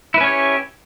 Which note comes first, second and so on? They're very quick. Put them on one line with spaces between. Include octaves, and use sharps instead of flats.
E4 B4 C#4 C#5 G4